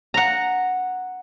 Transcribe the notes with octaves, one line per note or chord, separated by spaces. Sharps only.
F#5 A#5